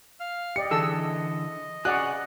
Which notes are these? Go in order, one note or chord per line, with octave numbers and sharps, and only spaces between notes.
F5 F6
G4 D5 D#5 C#7
D3 E3 G#4 A4 D#5 E6
F#4 G#4 D5 F5 F#5 G#5 F#6